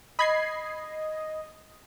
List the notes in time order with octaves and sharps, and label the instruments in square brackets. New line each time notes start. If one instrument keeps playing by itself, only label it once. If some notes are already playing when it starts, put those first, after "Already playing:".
[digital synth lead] D#5 [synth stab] B5 G#6 C7